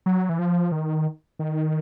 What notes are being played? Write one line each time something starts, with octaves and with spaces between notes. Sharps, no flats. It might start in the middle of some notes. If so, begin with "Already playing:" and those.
F#3
E3
F3
D#3
D#3